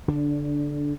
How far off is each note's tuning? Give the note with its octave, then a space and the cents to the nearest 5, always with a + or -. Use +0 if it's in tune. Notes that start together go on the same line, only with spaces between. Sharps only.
D3 -20 D4 +0